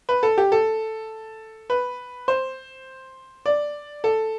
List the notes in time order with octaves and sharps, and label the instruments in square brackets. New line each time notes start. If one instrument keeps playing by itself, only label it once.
[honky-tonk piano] B4
A4
G4
A4
B4
C5
D5
A4